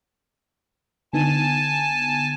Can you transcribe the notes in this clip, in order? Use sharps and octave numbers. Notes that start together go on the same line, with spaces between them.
D3 B3 D#4 G#5 A5